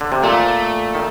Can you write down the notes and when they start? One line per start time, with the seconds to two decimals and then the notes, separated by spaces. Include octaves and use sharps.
0.01 D3
0.12 C3
0.23 A#2 A3
0.95 D#3